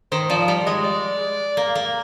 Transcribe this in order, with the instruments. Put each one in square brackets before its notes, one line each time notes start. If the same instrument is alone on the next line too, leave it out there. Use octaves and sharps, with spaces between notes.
[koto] D#3 [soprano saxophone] C5
[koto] F3 [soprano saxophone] D5
[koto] G3 [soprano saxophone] D5
[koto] G#3 [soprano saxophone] D#5
[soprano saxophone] D5
[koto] A#3
A#3